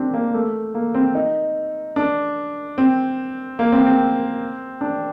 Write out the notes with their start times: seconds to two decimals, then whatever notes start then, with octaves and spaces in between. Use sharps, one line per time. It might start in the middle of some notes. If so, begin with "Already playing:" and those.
Already playing: C4 D4 G4
0.14 A#3
0.34 A3
0.74 A#3
0.94 C4
1.15 D#4
1.96 D4
2.78 C4
3.59 A#3
3.72 C4
3.86 C4
4.81 D4